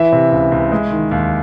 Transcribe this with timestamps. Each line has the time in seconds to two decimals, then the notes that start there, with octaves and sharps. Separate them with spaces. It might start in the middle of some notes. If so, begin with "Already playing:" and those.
Already playing: E3 E4 E5
0.12 C3
0.32 C#2
0.52 C#2
0.72 G#3
0.91 D#3
1.11 D#2